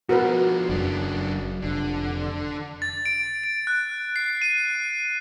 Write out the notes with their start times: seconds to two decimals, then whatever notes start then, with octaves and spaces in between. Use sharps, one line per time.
0.09 B2 F3 F#4 A#4 B4
0.69 F#1 F#2 F#3 D4
1.62 F1 D3
2.82 A6
3.06 D7
3.44 D7
3.67 F#6
4.16 C7
4.42 D#7